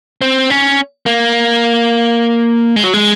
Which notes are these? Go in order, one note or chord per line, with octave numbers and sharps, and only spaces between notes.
C4
C#4
A#3
G#3
F#3
G#3